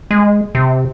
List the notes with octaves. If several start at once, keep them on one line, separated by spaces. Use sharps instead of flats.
G#3
C3